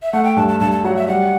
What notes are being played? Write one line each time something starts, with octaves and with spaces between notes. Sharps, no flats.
E5
A3 F#5
G5
G2 A5
A5
G2 A5
A5
F#3 F#5
E5
G3 F#5